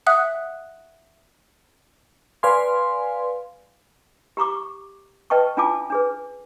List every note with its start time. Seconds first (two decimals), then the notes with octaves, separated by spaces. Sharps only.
0.07 E5 F#5 D#6 F#6
2.43 B4 D5 F5 G#5 C6
4.37 G4 A#5 C#6 D6
5.30 B4 D#5 G5 A5 C#6
5.57 C#4 D4 F4 G#5 A5 D6
5.90 D4 G#4 B4